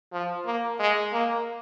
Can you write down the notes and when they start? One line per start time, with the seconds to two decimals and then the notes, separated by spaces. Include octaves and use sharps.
0.13 F3
0.46 A#3
0.79 G#3
1.13 A#3